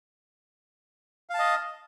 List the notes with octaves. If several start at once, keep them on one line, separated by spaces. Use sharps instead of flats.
D#5 F5 A5